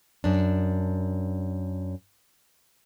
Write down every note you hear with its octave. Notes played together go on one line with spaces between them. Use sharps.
F#2 D4